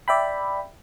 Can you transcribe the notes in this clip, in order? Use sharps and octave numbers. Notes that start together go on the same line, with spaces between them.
D5 E5 G5 B5